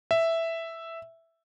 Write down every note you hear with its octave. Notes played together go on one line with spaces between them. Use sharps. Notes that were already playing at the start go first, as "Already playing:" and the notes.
E5